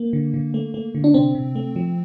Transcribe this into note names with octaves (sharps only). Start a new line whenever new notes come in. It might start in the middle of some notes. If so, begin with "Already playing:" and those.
Already playing: A#3
D3
D3
A3
A3
D3
D4
C3 C4
C3
A3
F3